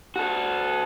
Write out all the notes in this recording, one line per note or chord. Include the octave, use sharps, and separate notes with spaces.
F#4 A4